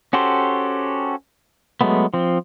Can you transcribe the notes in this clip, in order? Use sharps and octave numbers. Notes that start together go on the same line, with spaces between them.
C#4 F#4 G4 A4 C5
F#3 G#3 A3 B3
F3 C4